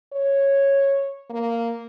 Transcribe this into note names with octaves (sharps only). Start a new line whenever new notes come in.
C#5
A#3